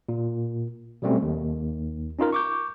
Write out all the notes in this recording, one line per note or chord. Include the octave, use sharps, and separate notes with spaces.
A#2
B2 F#3 G3 A3 C4 C#4
D#2
C#4 D#4 F4 A#4
C#6 D6 G6